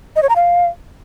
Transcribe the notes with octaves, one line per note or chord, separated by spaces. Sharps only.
D#5
C#5
A#5
F5